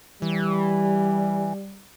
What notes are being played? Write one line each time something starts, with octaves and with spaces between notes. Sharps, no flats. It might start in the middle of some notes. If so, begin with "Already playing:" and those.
E3 G3